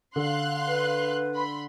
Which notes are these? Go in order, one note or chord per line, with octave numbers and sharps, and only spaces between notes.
D3 F5 C6 F#6
B4
B5 C6